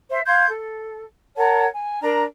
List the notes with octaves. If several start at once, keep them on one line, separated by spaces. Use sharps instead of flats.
C5 E5
F5 C6 G6 G#6
A4
A#4 C#5 F#5 A5
G#5
D4 A#4 A5 A#5